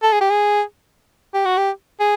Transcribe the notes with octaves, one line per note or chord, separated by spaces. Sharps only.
A4
G#4
G4
G#4
G4
F#4
G4
G#4